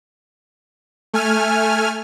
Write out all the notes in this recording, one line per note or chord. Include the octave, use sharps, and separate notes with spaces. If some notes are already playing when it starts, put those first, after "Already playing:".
A3 G#5 F6